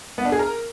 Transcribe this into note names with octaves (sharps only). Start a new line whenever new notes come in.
B3
D4
G#4
A#4